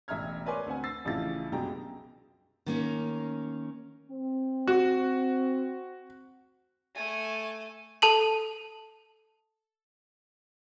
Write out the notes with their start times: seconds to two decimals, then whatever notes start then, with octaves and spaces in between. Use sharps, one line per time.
0.08 E1 A1 E5 A#5 F6 G#6
0.46 A#4 B4 C#5 D5 G#5 C6
0.66 D2 C4 F#5 G#5
0.84 E6 A6 C7
1.05 A1 F2 C#3 E4 F4 A6
1.52 C2 F#2 B2 G#3 G5 A#5
2.66 D#3 A#3 C#4
4.10 C4
4.67 F#4
6.95 A3 G#5
8.02 A4 A5 F#7